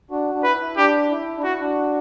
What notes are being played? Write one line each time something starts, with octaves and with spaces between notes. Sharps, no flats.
D4 F#4
D4
E4 B4
E4
D4 G4
E4
D4
E4 F#4
D4 F#4